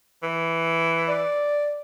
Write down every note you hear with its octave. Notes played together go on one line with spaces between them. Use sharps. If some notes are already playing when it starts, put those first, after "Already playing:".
E3
D5